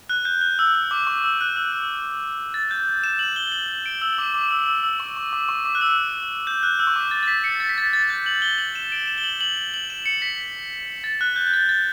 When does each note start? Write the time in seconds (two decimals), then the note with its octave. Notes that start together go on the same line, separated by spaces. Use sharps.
0.10 F#6
0.25 G6
0.41 F#6
0.59 E6
0.75 E6
0.91 D6
1.07 C#6
1.24 E6
1.41 F#6
1.56 E6
1.72 E6
2.54 A6
2.71 G6
3.04 E7
3.19 F#7
3.36 G7
3.48 G7
3.52 F#7
3.68 F#7
3.86 D7
4.01 E6
4.18 D6
4.34 D6
4.51 E6
4.66 E6
4.83 E6
5.00 C#6
5.16 C#6
5.33 D6
5.49 C#6
5.65 D6
5.75 F#6
5.81 E6
6.47 G6
6.63 F#6
6.79 E6
6.87 C#6
6.96 D6
7.11 A6
7.23 A6
7.28 B6
7.44 C#7
7.60 A6
7.69 B6
7.78 A6
7.93 A6
8.10 G6
8.26 F#7
8.42 G7
8.58 F#7
8.75 E7
8.92 D7
9.07 E7
9.18 G7
9.24 F#7
9.41 F#7
9.57 F#7
9.74 F#7
9.90 E7
10.06 C#7
10.22 B6
11.04 A6
11.21 F#6
11.36 G6
11.47 G6
11.54 A6
11.69 A6